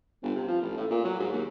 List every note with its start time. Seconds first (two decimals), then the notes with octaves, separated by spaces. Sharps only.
0.23 G1
0.36 C3
0.48 F3
0.61 A1
0.77 A2
0.90 A#2
1.04 F#3
1.20 G#2
1.33 D#2